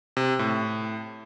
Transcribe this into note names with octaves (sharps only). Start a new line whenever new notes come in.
C3
A2